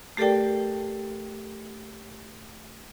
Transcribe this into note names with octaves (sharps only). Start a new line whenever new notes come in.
A3 G4 A4 A#4 D5 G5